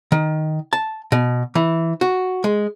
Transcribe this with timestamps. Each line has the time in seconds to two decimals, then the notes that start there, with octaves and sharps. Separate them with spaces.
0.12 D#3
0.73 A5
1.12 B2
1.55 E3
2.01 F#4
2.44 G#3